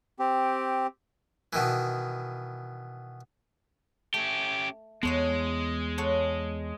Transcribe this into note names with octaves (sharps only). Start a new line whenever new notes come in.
C4 G4
B2 D#3 E3
A3 C#4 G4
E2 G#3 B3 A4 C#5 F#5
A4 C#5 F#5